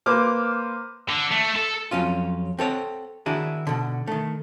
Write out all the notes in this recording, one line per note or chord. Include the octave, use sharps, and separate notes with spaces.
A#3 B4 C5 D6 F6
D3
A3
A4
F2 F#3 C#4 F4
C4 A4 C#5 F#5
D#3 D4 E4 F#4 G#4
B2 D3
D#3 A3